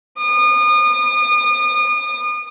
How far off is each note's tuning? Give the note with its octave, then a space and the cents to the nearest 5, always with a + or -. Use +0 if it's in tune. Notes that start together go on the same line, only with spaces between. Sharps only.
D#6 -35